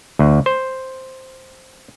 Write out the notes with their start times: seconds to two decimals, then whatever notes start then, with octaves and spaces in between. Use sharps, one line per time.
0.19 D2
0.46 C5